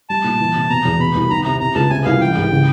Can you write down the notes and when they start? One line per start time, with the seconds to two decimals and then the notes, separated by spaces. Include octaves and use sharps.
0.10 G3 A5
0.24 A#2
0.40 E3
0.55 C3
0.70 B2 A#5
0.85 E2
1.00 B2 B5
1.15 C2
1.30 D#3 A#5
1.45 C3 A#5
1.60 C3 A#5
1.75 C#2 A5
1.90 C3 G#5
2.05 C2 F5
2.21 E3 G5
2.36 G#2
2.51 C#3